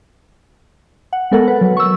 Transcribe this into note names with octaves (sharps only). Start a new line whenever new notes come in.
F#5
G#3 B3 A4 A#4 F#5
B4
F#3
C#6 E6